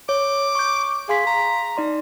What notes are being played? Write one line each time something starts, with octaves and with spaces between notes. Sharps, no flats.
C#5 D6
C#6 G6
G#4 F5 C6 B6
A#5
D#4 D5 C6